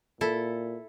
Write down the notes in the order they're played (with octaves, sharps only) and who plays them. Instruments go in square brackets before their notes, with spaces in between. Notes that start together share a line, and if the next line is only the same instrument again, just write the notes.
[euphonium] A#2 [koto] E4 A4